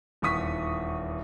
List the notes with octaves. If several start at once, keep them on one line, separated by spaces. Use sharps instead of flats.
D#1 E2 C#6 D#6 B6